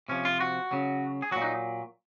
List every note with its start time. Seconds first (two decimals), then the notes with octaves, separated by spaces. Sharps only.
0.09 C3 F3 C#4
0.25 F4
0.40 F#4
0.71 C#3 F#3
1.22 G#4
1.31 A#2 F#3 F#4
1.42 D#4